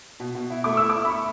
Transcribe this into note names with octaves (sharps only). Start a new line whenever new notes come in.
B2
B2
E4
A3 D6
E4 E6
D6
E4
B5
C#6